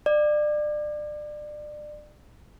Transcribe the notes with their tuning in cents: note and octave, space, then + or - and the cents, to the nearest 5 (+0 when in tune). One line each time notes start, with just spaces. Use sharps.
D5 +30